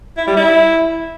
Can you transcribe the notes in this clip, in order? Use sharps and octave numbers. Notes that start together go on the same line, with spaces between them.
E4
G3
E4